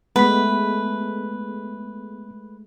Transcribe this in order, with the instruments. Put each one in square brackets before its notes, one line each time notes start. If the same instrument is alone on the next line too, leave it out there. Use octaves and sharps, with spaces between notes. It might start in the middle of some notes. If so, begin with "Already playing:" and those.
[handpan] G#3 A3 [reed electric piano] B3 B5 [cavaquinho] B4